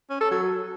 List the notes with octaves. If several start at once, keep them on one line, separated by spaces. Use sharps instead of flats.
C#4
A4
F#3